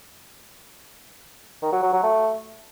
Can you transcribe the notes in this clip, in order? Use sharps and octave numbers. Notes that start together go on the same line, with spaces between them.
D#3
F#3
F#3
F#3
A3